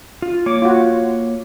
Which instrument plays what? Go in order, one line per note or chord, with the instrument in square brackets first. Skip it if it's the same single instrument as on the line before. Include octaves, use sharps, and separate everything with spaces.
[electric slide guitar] F4
[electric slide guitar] A#3 C#5 [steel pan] D6
[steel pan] F4 F#4